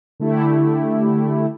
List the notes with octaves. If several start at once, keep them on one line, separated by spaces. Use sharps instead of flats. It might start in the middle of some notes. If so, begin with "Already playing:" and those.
D3 A3 E4 G4